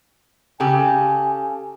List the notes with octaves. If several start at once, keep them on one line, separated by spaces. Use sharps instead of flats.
C#3 G4 A4 G#5